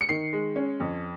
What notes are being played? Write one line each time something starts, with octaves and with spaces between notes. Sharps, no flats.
C#7
D#3 C7
G#3
C#4
F2